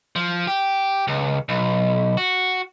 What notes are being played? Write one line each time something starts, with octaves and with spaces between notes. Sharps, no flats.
F3
G4
C#2
B1
F#4